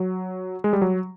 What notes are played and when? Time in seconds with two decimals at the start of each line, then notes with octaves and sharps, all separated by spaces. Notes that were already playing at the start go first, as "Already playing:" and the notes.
Already playing: F#3
0.64 G#3
0.73 G3
0.82 F#3